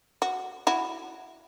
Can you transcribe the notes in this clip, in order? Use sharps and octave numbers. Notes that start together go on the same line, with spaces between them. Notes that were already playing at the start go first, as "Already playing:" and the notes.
F#4
E4 F#4